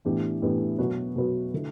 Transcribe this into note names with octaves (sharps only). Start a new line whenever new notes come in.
A2 E3 B3 D4 G4
A2 E3 B3 D4 G4
B2 F#3 B3 F#4 B4
B2 F#3 B3 F#4 B4
D3 A3 E4